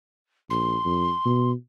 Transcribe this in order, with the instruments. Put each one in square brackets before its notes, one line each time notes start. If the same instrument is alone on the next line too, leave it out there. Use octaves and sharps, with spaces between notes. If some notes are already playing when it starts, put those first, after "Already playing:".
[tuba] A#1 [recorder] C6
[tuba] F2
B2